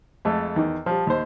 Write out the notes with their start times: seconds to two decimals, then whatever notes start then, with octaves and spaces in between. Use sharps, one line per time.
0.25 F2 G#3 A3
0.56 E2 D#3
0.86 F3 G3
1.07 D#2 C5